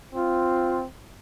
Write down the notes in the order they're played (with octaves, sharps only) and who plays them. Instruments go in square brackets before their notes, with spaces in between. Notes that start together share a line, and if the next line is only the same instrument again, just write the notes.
[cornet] C4 [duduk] F4